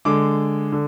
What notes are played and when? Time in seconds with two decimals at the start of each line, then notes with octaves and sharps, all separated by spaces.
0.05 D3 G#3 D6
0.72 D3